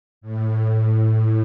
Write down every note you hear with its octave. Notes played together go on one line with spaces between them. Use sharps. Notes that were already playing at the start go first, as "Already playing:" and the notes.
A2
A2